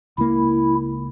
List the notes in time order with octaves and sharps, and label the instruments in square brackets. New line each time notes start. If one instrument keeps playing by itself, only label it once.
[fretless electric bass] C#2 A#3 [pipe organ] E4